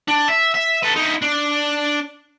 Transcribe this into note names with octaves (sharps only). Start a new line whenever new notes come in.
D4
E5
E5
A4 B4
D#4 E4
D4